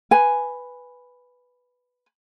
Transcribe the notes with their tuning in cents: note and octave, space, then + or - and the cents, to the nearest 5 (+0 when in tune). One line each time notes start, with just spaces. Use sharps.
B4 +0 G#5 +0